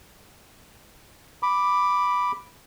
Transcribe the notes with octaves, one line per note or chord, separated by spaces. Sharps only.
B5 D6